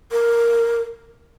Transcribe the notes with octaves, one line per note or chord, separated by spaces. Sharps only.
A#4